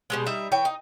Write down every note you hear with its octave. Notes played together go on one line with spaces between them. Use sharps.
B2 G3 G#3
G3 D#4 E5
E3 C#5 G5
D#4